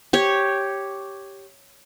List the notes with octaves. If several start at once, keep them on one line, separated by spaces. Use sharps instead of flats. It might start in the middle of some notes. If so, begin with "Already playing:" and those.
G4 C#5